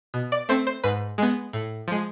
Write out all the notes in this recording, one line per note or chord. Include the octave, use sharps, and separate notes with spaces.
B2
D5
A3 C4 C5
C5
G#2 B4
G#3 B3
A2
F3 G#3